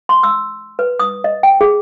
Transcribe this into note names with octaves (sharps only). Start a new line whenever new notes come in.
C6
E6
B4
D#6
D#5
G5
G#4